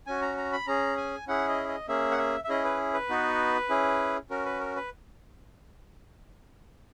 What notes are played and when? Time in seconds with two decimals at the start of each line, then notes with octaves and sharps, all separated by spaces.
0.07 C#4 F#4 G#5
0.22 A#5
0.37 A#5
0.53 B5
0.67 C#4 G#4 A#5
0.97 G#5
1.27 C#4 E4 G#4 F#5
1.48 D#5
1.68 D#5
1.88 A#3 C#4 G#4 E5
2.11 F#5
2.18 E5
2.44 E5
2.49 C#4 E4 G#4 D#5
2.64 B4
2.93 B4
3.09 B3 D#4 F#4
3.69 C#4 E4 G#4
4.30 C#4 F#4 A#4
4.45 B4
4.60 A#4
4.76 B4